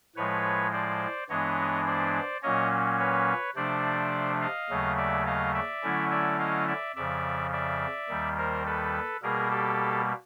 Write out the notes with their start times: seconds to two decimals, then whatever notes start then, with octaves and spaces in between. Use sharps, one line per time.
0.16 A2 F3 G#3 B4 C#5
0.73 C5 D5
1.29 G2 E3 G#3 B3 D4 C#5 D#5
1.86 C5 D5
2.42 A#2 F#3 A#3 C#4 C#5 D#5
2.99 B4 C#5
3.56 C3 F3 A3 D4 C5 D5
4.41 D#5 F5
4.69 D#2 C#3 F#3 A3
4.97 D5 E5
5.26 D#5 F5
5.54 D5 E5
5.83 D3 F#3 A3 C#4 E4
6.11 D5 E5
6.39 D#5 F5
6.68 D5 E5
6.96 F2 C#3 F3 D5 E5
7.52 D5 E5
8.09 D#2 D#3 G3
8.37 A#4 C5
8.66 A4 B4
9.22 B2 G3 A#3 G#4 A#4
9.51 G4 A4